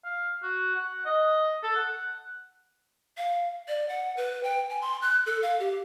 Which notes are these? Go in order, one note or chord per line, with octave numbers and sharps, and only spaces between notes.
F5
F#4
F#5
D#5
A4
F#5
F5
D5
F#5
B4
G5
G#5
C6
F#6
A4
F5
G4